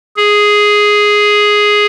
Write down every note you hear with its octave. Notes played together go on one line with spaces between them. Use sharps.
G#4